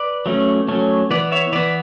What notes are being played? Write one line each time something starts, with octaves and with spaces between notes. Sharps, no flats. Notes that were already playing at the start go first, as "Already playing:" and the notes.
Already playing: B4 D5
F#3 A3 C#4
F#3 A3 C#4
E3 B3 B4 D5
C#5 E5
E3 B3 B4 D5